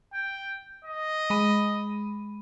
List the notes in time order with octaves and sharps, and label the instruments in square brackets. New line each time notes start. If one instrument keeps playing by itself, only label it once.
[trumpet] G5
D#5
[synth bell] G#3 B5 D#7